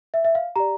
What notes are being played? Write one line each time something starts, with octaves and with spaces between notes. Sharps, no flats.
E5
E5
F5
G4 D5 A#5